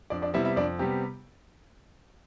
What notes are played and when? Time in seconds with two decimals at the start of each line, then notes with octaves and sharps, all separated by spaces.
0.10 F2 D4 D5
0.22 D4 D5
0.34 C3 G3 B3 E4 E5
0.45 E4 E5
0.56 F2 D4 D5
0.79 C3 G3 B3 G4